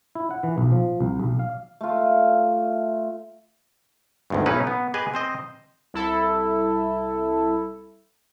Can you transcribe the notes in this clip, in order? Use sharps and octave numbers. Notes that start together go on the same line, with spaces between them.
E4
F#5
E3
B1
F3
C2
B1
F5
A3 F4
G#1 D2 G2
B1 C#4 D#4 E4 B4
B3
G4 G#4 B4 D#5 G#5
C4 C5 D#5
C2 E4 A4